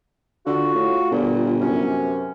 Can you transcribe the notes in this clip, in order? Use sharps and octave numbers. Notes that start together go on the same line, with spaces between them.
D3 F4 F#4
A2
G1 A#2
F#2 C3 C#4